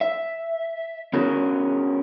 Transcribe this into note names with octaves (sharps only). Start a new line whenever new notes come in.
E5
B3 C#4 F#4 G#4 A#4